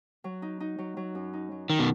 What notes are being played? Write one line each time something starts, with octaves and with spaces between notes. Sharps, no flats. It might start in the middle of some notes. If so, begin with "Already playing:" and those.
F#3
D#4
D#4
F#3
F#3
F#2
D#4
F#3
D#3
B2